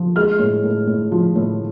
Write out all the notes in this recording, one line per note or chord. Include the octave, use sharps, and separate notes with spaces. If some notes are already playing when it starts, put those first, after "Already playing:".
Already playing: F3
G#3 F6
A2
A2
A2
F3
A2